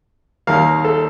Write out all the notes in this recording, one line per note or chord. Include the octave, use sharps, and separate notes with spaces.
D#2 D#3 A#3 F5
A4